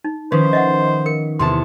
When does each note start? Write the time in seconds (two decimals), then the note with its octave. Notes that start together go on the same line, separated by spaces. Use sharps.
0.05 D#4
0.32 D#3 F3 C#4 B4 C5
0.53 D#5 E5 F#5
1.06 A#4 C#7
1.39 E2 C3 A5 C6